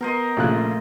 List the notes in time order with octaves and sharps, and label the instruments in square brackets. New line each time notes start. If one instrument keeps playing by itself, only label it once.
[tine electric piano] B3 [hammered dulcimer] A#4 C5 D#5
[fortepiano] A#1 C#3 F#6 [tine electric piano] A3